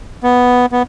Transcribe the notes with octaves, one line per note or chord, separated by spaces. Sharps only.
B3
B3